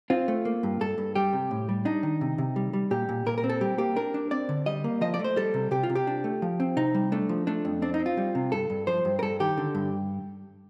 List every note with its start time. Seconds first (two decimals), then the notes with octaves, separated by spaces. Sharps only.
0.10 C4 F4
0.28 A3
0.45 A#3
0.63 G2
0.81 G2 A4
0.98 G2
1.15 G3 G4
1.33 C3
1.51 A2
1.69 G3
1.85 D4 D#4
2.03 D#3
2.21 C3
2.38 C3
2.56 G3
2.73 G3
2.91 A#2 G4
3.09 A#2
3.26 A#2 A#4
3.38 A#4
3.44 C4
3.49 A4
3.61 G3 G4
3.78 A#3 G4
3.96 D4 A#4
4.14 D4
4.31 C4 D5
4.49 D3
4.66 G3 D#5
4.84 A#3
5.01 F3 D#5
5.14 D5
5.19 A3
5.24 C5
5.36 G3 A4
5.54 C3
5.71 C3 G4
5.83 F4
5.89 C3
5.95 G4
6.07 D4
6.24 A3
6.42 F3
6.60 C4
6.77 C3 D#4
6.95 G3
7.12 A3 D4
7.29 F3
7.47 A3 D4
7.65 F2
7.82 C4 D4
7.94 D#4
7.99 C4
8.06 F4
8.17 G3
8.35 C3
8.52 G2 A4
8.70 G2
8.87 F3 C5
9.05 G2
9.19 A#4
9.22 G2 A4
9.40 D#3 G4
9.58 D3
9.75 G2